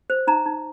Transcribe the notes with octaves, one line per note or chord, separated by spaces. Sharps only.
C5
D#4 A#5
D#4